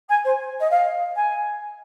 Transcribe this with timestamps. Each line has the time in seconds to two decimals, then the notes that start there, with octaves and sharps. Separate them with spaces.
0.09 G#5
0.24 C5
0.60 D#5
0.70 F5
1.15 G#5